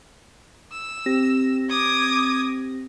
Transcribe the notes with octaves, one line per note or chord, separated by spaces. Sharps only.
E6
C4 G4 A#6
D6 D#6 G#6